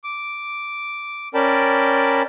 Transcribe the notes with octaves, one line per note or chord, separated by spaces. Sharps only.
D6
C#4 A#4 D5 G5 A5 B5